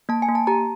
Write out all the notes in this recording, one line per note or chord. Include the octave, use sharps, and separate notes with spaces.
A#3 A5
G#5
A#3
A5
G4 A#5